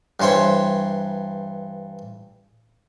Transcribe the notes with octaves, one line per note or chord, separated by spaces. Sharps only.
G2 E3 C5 C#5 G5